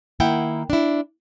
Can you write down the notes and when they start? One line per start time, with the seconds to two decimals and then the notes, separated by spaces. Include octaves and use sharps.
0.20 D#3 A#3 E4 F#5 G5
0.70 D4 E4